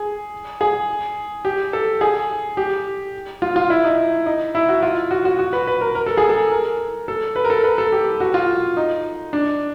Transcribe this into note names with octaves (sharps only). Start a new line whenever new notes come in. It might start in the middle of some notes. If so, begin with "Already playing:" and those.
Already playing: G#4
G#4
G4
A4
G#4
G4
F4
F4
E4
D#4
D#4
E4
F#4
F4
F#4
F#4
F#4
B4
B4
A#4
A#4
A4
G#4
A4
A#4
A4
B4
A#4
A4
B4
A4
G4
F#4
F4
D#4
D4